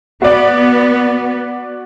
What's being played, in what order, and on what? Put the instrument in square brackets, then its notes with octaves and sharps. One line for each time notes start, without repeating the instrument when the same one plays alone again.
[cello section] B3 [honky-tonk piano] F#4 D5